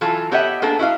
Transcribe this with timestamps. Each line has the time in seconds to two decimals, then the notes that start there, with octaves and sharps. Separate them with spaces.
0.01 E3 F#3 F4 A4
0.31 B3 G4 C#5 D#5 E5 F#5
0.62 A#3 B3 D4 G#4 A4
0.79 E4 F#4 D#5 F5